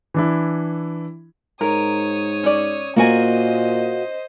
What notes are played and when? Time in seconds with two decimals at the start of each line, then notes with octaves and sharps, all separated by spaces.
0.14 E3 D4 E4
1.61 G#2 A#4 C#5 D#6
2.44 C#4 D5
2.96 A#2 A#3 F#4 C5 D#5 G#5